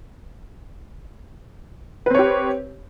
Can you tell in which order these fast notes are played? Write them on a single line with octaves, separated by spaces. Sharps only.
B4 C4 C#5 G4